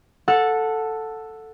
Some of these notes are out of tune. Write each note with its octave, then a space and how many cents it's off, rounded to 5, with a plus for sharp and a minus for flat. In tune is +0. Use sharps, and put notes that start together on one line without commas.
A4 +5 F#5 -20